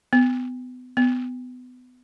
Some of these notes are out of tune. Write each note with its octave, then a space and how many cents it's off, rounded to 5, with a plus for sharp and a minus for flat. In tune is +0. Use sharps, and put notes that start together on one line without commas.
B3 +30
B3 +25